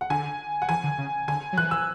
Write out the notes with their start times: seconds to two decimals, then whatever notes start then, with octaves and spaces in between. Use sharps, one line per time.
0.01 F#5
0.10 D3 G#5
0.62 F#5
0.69 E3 G#5
0.84 D3
0.98 C#3
1.28 D3 G#5
1.53 F#3
1.57 E3 F#6
1.71 E6